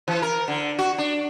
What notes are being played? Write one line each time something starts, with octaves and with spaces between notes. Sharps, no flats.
E3
A#4
D3
F#4
D4